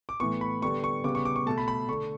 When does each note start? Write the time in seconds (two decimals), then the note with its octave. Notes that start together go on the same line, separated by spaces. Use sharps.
0.09 D6
0.20 A2 E3 B3 C#6
0.41 B5
0.62 D3 G3 B3 C#6
0.84 C#6
1.04 C#3 G3 B3 D6
1.15 C#6
1.25 D6
1.36 C#6
1.46 B2 A3 A5
1.58 B5
1.68 B5
1.88 D3 A3 C#6